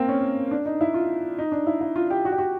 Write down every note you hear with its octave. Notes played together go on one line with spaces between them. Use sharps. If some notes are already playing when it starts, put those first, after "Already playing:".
Already playing: A#3 C4
C#4
D4
D#4
E4
F4
D#4
D4
E4
E4
F4
G4
F#4
G4
F#4